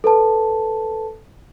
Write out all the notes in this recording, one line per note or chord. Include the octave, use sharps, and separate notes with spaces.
A4 B4 A5